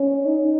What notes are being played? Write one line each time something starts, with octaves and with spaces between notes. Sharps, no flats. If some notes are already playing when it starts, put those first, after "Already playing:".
Already playing: C#4
D#4